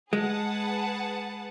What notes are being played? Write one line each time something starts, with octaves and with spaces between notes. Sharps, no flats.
G#3 G#4 B4 F#5 A5